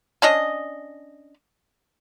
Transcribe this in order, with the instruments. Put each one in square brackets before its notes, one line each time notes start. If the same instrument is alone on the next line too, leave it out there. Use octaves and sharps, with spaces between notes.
[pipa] C#4 D4 D#5